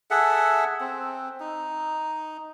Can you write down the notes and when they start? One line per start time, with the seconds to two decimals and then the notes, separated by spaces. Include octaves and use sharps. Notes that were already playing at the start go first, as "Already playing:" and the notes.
0.11 G#4 A4 E5 F#5
0.80 C4
1.40 D#4